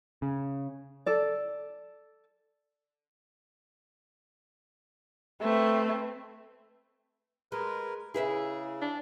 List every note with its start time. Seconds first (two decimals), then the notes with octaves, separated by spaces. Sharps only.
0.22 C#3
1.06 A4 D5
5.42 A3 C4 B4
7.52 G#3 A#4 B4
8.14 C#3 E4 G#4 B4 E5
8.81 D4